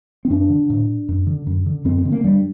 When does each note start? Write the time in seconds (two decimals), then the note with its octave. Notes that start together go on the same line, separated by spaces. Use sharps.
0.25 C4
0.30 F#2 D4
0.50 D3
0.70 A2
1.09 F#2
1.27 D3
1.47 F#2
1.66 D3
1.85 F#2 C4
1.98 C4
2.05 D3
2.12 A#3
2.24 G2 G3